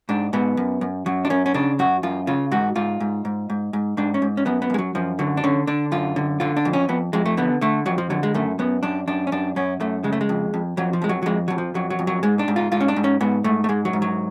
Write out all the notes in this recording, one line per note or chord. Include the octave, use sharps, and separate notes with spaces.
G#2 D4
G#2 B3
F#2
F#2
F#2 F#3
D4
F#2 C#4
C#4
C#3 D4
F#2 F#4
F#2 F4
C#3 F4
G#2 F#4
G#2 F4
G#2
G#2
G#2
G#2
G#2 D4
C#4
G#2
C#4
F#2 B3
B3
F#2 G#3
F#3
F#2 F3
D3 F#3
D4
D3 C#4
D3 D4
F#2 F4
D3
D3 F4
D4
F2
C#4
F2 B3
F2 G#3
A3
D3 B3
D3 A3
F2 F#3
F3
D3 F#3
G#3
F#2 A3
F#2 B3
F#2 D4
F#2 D4
C#4
F#2 D4
F#2 C#4
F#2 A3
C#3 G#3
A3
G#3
F2
F2
F2 F#3
F3
F2 G#3
F#3
F#3
F2 G#3
F2 F#3
F3
F2 F#3
F#3
F2
F#3
G#2 G#3
D4
G#2
F4
G#2 F4
C#4
D4
G#2
C#4
G#2 B3
G#2 A3
A3
G#2 G#3
F#3
G#2
F#3